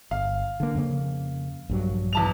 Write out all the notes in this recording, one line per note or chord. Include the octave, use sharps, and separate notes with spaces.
G1 F5
D3 A#3
F2 C#3 A#3
A#1 G2 F#3
E2 A5 F7